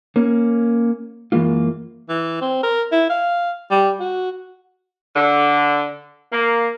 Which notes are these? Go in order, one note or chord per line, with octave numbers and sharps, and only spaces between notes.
A#3 C#4
F#2 E3 G#3 A#3 F4
E3
C4
A#4
E4
F5
G3
F#4
D3
A#3